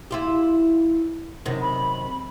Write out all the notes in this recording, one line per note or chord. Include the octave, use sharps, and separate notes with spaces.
E4 F4 G4
F#2 C3 D#3
B5